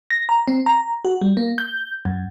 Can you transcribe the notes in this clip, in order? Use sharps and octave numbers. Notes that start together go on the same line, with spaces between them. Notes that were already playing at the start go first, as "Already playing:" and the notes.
A#6
A#5
C4
A#5
F#4
G3
A#3
G6
F#2